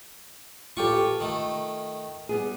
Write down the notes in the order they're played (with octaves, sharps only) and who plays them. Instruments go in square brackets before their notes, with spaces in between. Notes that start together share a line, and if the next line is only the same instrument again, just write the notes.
[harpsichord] A1 G4 C#6 [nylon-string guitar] F4 A4
[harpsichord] D#3 A3
[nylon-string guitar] G3 B3 G#4